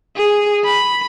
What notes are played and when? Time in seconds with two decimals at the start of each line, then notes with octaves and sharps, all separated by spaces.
0.17 G#4
0.65 B5